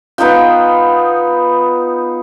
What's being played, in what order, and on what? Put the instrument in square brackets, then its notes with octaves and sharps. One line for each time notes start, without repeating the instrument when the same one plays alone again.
[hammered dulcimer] B3 D#4 F4 G5